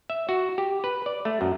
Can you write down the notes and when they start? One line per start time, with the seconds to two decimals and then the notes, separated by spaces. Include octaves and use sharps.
0.10 E5
0.29 F#4
0.58 G4
0.84 B4
1.06 D5
1.25 A3
1.41 F#2